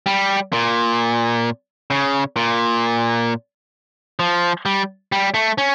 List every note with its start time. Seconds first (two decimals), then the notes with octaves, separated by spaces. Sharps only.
0.06 G3
0.53 A#2
1.91 C#3
2.36 A#2
4.19 F3
4.66 G3
5.12 G3
5.34 A3
5.58 C#4